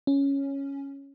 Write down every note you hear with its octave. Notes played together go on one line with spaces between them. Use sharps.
C#4